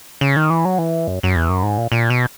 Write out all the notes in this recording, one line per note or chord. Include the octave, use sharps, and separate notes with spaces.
C#3
D#3
E3
F#3
E3
F#2
F#2
E2
F#2
G#2
A#2
A#2
B2